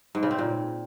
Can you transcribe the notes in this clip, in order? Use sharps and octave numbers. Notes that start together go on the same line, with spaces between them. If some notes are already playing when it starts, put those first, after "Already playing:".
G#2
C#3
C4
A#2